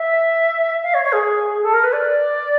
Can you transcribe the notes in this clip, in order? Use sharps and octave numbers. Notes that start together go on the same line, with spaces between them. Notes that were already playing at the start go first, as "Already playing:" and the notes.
Already playing: E5
F5
C#5
C#5
G#4
A4
A#4
B4
D5